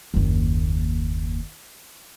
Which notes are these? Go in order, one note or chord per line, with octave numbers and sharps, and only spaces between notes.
F#1 D#2